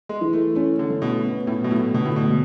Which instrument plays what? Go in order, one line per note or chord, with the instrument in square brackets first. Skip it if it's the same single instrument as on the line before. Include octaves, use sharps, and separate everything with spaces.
[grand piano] G#3
[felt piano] E3
[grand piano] A3
[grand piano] A3 [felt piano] C#4
[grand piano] D3
[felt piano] A3
[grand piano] B2
[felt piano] B3
[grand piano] A2
[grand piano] B2 [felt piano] F#3
[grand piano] A2
[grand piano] B2 [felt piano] D3
[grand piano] A2
B2
[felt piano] G#3